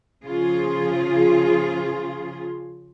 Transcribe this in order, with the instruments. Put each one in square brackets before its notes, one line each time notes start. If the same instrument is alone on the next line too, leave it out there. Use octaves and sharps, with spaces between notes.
[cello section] C#3 F3 F4 G#4